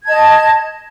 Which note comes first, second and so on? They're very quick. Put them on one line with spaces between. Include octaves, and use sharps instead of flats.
G#6 A5 D#5